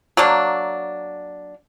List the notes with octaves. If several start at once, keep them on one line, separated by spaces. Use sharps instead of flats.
F#3 A#3 D4